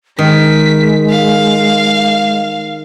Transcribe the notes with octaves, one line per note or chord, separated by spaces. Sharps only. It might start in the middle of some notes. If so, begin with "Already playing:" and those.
D#3 G#3 B6
F5